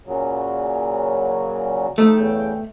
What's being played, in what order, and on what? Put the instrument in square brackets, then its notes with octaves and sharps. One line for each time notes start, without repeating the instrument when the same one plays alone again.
[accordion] A#2 C#3 F#3
[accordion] F3 D#4 [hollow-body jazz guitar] A3
[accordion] E2 C#3 G5